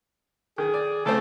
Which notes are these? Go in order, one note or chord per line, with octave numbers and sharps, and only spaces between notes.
D#3 G#4
D5
C#3 A3 C4 A4